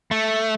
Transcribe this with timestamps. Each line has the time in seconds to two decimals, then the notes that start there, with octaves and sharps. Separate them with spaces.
0.11 A3